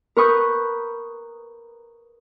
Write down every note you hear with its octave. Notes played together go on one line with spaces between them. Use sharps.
A#4 B4 C#6 D#6 G6